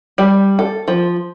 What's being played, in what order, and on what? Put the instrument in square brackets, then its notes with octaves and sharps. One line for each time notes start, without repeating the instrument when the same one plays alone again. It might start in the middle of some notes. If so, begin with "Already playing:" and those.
[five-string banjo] G3
A4
F3